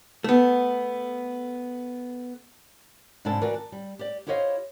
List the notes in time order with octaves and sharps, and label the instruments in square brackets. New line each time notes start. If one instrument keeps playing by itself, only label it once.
[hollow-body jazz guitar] A3 B3
[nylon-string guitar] G#2 C3 D4 E4 A4 A5
E3 F#4 A#4 D5
A5
G3
G4 D5
E4 G4 C5 C#5 D#5 F5